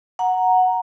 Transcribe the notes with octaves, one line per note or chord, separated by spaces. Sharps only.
F#5 A#5